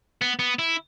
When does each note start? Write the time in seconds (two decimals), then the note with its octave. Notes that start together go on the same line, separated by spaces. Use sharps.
0.22 B3
0.39 B3
0.59 E4